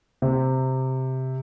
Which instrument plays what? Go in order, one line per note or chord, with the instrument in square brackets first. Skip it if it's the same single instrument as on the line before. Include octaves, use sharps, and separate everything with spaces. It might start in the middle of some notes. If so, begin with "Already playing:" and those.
[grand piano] C3